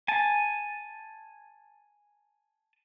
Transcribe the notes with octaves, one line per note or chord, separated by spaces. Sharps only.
G#5 A5